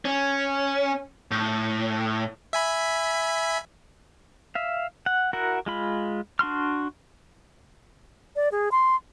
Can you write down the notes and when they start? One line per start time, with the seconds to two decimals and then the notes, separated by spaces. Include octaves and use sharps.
0.05 C#4
1.31 A2
2.53 E5 G#5 B5
4.55 E5 F5
5.06 F#5
5.33 E4 F#4 A#4 F#5
5.66 G#3 F4 B5
6.39 D4 F#4 C6 F6
8.36 D5
8.51 G#4
8.71 C6